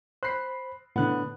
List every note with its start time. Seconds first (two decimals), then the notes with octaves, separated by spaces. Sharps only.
0.23 C5 B5 F#6 C7
0.96 A2 D3 B3 F#6